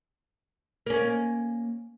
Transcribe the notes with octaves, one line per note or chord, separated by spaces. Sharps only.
A#3 C#4